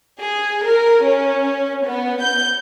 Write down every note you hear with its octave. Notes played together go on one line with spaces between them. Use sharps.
G#4
A#4
C#4
B3
G6